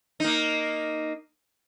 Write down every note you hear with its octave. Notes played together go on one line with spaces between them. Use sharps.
A#3 D#4